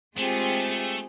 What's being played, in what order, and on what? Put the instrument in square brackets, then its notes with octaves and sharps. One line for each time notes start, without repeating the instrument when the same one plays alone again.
[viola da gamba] G#3 F4 G#4 [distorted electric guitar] A3 [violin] C4 G4